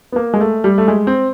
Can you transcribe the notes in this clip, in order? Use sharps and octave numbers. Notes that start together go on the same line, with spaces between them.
B3
A#3
G#3
A3
G3
A3
G#3
C4